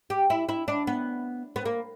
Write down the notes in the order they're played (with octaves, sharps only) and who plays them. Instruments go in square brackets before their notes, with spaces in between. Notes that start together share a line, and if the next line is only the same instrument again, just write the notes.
[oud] G4
E4
E4
D4
B3
B3
A#3